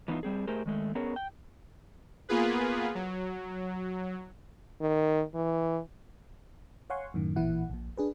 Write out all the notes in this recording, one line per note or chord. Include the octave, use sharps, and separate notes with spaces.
E3 B3 C#4 D#4 F4
G3 C4 G#4
A3 G4 G#4 A#4 C5
D#3 G#3 A3
B3 C#4 G#4 A#4 C#5
G5
A#3 B3 F4 G#4 B4
F#3
D#3
E3
C#5 F5 F#5 G#5 C6 C#6
F#2 A2 D#3
A1 A#2 E3 E4 F#5
A#1 A#2
D4 G#4 B4